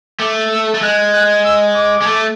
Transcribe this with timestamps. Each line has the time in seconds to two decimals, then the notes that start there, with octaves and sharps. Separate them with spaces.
0.19 A3 D6
0.51 E6
0.74 A3
0.82 G#3 F#6
1.13 F#6
1.45 E6
1.76 D6
2.02 G#3
2.07 A3